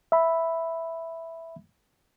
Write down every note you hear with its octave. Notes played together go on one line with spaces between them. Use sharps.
E5 B5